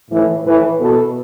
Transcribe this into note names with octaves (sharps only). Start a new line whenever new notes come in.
A2 E3
A2 E3 B4
B2 A4